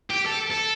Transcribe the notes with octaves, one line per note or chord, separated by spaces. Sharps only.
G4
A4
A4